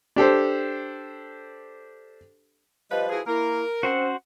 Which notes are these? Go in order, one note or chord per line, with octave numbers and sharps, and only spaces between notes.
D4 G4 A4 C5
F3 G3 B4 D#5
E4 F#4 G#4 B4
A#3 E4 A#4
C4 C#4 F#4 C5 F#5